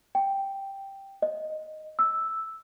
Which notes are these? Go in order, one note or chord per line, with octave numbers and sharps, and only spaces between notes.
G5
D#5
E6